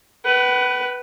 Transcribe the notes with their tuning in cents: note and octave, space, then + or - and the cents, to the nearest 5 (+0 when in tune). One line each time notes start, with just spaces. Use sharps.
B4 +0 F#5 +40